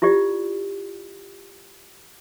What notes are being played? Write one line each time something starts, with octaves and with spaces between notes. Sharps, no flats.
E4 F4 G4 D5